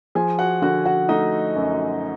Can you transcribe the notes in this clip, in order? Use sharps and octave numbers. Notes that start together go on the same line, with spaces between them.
F3 G#4 G#5
F#4 F#5
D3 F#4 F#5
F#4 F#5
A3 D#4 D#5
F#2